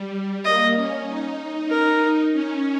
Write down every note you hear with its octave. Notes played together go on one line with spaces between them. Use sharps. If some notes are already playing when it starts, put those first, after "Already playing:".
Already playing: G3
A#3 D#5
C#4
D#4
A#4
C#4